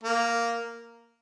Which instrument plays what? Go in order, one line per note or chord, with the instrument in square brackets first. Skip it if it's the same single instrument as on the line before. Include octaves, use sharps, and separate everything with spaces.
[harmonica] A#3